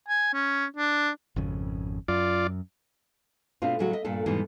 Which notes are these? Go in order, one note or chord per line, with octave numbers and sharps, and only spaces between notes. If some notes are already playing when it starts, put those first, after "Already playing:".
G#5
C#4
D4
G#1 F2 C#3
F#2 F4 D5
B2 A3 C4 D4 F4
A2 C#3 F#3 G#3 F#4
D#5 E5
G2 A#2 D4 A4
E2 G#2 B2 E3 G3